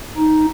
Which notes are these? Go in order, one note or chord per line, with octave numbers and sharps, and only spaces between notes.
D#4